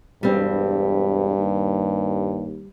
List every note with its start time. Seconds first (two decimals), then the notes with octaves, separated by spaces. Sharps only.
0.23 E1 G2 G3 C4
1.38 D#2